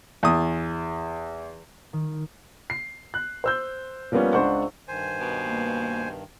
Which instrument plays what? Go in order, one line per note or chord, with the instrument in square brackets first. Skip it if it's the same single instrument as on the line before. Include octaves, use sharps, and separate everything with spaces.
[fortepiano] E2 D#6
[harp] D#3
[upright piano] C7
F#6
C5 E6 G6
F3 G3 A#3 B3 C#4
C#2 D4 C5 F#5 C#6
[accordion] G2 D#3 [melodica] C5 G#5
[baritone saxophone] B2
[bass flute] A#3